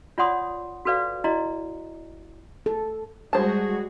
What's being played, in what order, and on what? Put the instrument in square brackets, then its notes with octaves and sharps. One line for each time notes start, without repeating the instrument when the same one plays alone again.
[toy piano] F4 C#5 D5 F#5 C6 D#6
F#4 A4 B4 D5 F5
E4 F#4 D5 D#5 A#5
[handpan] A4
[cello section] G3 G#3 F#4 [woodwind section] G#4 [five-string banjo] C5 A5